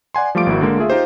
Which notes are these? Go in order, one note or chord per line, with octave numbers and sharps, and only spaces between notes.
D5 F#5 G#5 C6
F3 G3 A3 F4 D6 D7
G#1 A#3 E4 F#4
D3 G#3 A#3
A3 F4 G#4 E5
D#4 F4 G4 C5